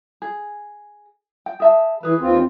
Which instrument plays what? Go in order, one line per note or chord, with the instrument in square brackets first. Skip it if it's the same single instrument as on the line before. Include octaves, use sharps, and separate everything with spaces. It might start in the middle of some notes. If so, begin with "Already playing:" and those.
[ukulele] G#4
G5
G#4 E5 A5
[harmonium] E3 [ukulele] G#4 B4
[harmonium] D#2 C4 F4